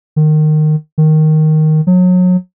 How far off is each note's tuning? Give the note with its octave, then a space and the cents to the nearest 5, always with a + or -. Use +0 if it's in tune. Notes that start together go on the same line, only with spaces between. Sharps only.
D#3 -20
D#3 +0
F#3 -30